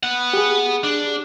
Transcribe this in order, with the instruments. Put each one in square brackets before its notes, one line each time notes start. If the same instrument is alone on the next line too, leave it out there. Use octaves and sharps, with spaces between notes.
[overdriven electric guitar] B3 F#5
[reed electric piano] G4 G#4
[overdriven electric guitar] D4